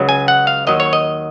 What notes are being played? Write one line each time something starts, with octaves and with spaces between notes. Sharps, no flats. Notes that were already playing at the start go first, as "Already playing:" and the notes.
Already playing: C#2 C#3 F#3
G#5
F#5
F5
D#2 D#3 F#3 D#5
C#5
D#5